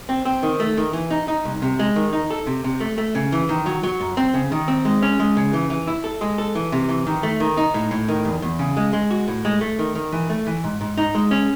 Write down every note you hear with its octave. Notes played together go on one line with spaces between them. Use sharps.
C4
C4
D#3
A3
D#3
E3
D#4
D#4
C2
C3
G#3
D#3
D#4
A4
C3
C3
A3
A3
C#3
E3
D#3
F#3
F#3
F#2
C4
C#3
D#3
C4
G#3
C#4
G#3
C#3
E3
E3
E4
A4
G#3
A4
E3
C3
E3
D#3
A3
D#3
D#4
A2
A2
D#3
E2
E2
C#3
G#3
G#3
F#4
A2
G#3
A3
D#3
D#3
E3
A3
E3
G#2
G#2
D#4
G#3
C#4